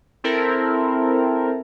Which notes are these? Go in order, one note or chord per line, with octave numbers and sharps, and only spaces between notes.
C4 E4 A4 A#4